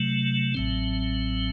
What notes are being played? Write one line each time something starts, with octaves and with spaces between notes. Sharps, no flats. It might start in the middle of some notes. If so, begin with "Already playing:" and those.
Already playing: C3 F#3 A3
A1 A2 F#3 C4